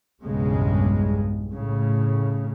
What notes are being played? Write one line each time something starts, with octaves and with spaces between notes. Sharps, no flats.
B1 E2 G2 C#3 G#3
A2 C#3